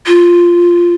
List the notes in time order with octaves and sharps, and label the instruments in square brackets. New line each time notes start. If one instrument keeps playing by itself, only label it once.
[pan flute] F4